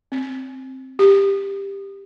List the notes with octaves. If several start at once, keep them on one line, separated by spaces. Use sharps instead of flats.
C4
G4